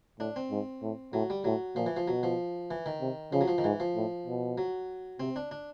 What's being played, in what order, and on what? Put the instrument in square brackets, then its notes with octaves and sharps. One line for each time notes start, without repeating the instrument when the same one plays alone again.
[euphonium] A2 [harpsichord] D4
[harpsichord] C4
[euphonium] G#2
A2
[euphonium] A2 [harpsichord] F#3
[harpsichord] G3
[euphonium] A2 [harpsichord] F#3
[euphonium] A#2 [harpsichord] F3
[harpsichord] E3
F3
[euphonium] B2 [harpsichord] F#3
[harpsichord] F3
E3
D#3
[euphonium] C3
[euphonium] C#3 [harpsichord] F3
[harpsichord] F#3
F3
D#3
[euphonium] G#2 [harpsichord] E3
[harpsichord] F3
[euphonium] A2
B2
[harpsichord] F#3
[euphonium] C3 [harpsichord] C4
[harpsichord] D4
D4